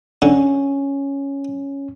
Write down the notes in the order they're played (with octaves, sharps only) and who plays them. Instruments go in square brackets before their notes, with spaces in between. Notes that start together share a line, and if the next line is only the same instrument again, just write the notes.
[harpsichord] D3 [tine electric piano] C#4